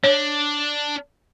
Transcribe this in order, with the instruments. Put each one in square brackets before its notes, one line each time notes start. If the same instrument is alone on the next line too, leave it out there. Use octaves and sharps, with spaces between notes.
[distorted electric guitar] D4 [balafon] C#5